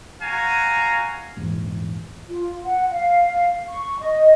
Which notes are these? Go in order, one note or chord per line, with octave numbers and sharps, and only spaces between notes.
F#4 F5 G#5 A#5
A#1 E2 G#2
F4
F#5
F5
C#6
D#5